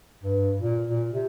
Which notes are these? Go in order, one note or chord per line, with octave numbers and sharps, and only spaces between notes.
G2
A#2
A#2
C3